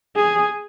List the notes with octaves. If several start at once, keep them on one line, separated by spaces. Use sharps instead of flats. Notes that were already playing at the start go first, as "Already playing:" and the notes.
G#4